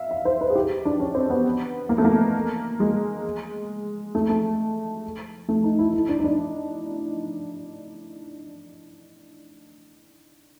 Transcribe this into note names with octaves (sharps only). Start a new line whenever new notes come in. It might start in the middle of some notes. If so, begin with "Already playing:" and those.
Already playing: E5 F5
E5
C5
B4
G#4
G4
D4
C#4
C4
B3
A#3
A3
A#3
G#3
A3
A3
A3
D#4
E4
E4
D4
D#4
D4